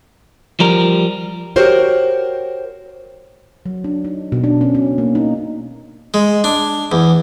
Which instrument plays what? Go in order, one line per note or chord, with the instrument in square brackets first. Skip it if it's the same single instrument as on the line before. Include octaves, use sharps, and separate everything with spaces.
[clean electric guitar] F3 G3 A#4
[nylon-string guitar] F#4 G4 A#4 C5 C#5
[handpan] F#3
D4
D#4
B2
D4
C#4
C#4
A#3
D#4
[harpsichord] G#3
D4
E2